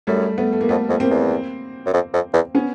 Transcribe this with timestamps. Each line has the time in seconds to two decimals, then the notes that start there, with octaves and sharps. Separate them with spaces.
0.07 F#2 G3 A3
0.38 A3 B3
0.53 A3
0.61 A#3
0.69 F2 A3 B3
0.89 F2
1.00 A#3 C4
1.11 E2
1.86 F#2
1.93 F2
2.14 F2
2.33 E2
2.55 B3 C#4